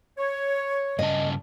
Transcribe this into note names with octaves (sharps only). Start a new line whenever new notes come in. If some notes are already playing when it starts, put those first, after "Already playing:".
C#5
G2 C#3 D#5 A5